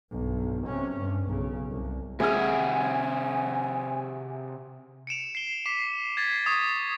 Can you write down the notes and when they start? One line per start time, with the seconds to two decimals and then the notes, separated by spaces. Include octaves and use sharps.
0.11 B1 G2
0.67 C3 C#4
0.97 G2
1.28 B1 C#3
1.71 C2
2.20 C3 G#3 G#4 E5 F#5 G#5 B5 F6
5.07 C#7 D7 E7 F7
5.35 C7 G7
5.66 D6 B6 C7 E7
6.17 G#6 A6 B6 C7 E7
6.44 C#6 D#6 G#6 A6